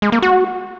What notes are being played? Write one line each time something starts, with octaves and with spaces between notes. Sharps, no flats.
G#3
A#3
F#4